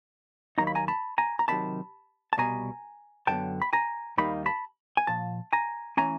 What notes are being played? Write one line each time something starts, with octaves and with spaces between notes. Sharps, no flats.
D#2 C#3 F#3 A#3 D#4 A#5
B5
G#5 A#5
A5 B5
G#5 A#5
A#5
C3 D#3 F#3 A5 B5
A5
C2 B2 G3 G#5 A#5
F#2 D3 F#3 B3 G5 A5
B5
G#5 A#5
D#2 D#3 G3 A#3 D#4 B5
A5 B5
G#5
A#2 F3 A5
G#5 A#5
E3 A3 C#4 G#5 A#5